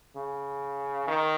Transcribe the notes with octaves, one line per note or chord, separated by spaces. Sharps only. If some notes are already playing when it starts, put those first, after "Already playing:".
C#3
D#3